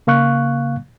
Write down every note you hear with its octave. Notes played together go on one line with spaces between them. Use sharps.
C#3 A#3 F5 C#6 F#6